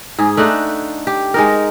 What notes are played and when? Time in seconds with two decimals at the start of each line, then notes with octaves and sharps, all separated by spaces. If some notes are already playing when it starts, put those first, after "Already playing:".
0.19 G#2 G#4
0.37 A3 D4 D#4 F#5
1.07 G4
1.34 G#3 D#4 A#4